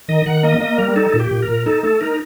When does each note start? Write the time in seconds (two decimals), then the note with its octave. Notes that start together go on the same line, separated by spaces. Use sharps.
0.08 D#3 D#5
0.26 D#3 F#5
0.43 A#3 D#5
0.60 A#3 D#5
0.78 G3 A#4
0.96 D#4 A4
1.14 A#2
1.19 G4
1.31 A#2
1.42 A#4
1.48 A#2
1.66 D#4 A4
1.83 A3 A4
2.01 D#4 A#4